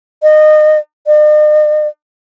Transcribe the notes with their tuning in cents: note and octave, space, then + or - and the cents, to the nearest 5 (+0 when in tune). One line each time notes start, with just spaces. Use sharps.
D#5 -25
D#5 -45